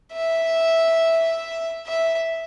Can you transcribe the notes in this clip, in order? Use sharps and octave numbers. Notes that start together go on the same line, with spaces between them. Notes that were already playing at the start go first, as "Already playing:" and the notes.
E5
E5